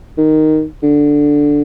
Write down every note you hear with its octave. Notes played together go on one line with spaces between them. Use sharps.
D#3
D3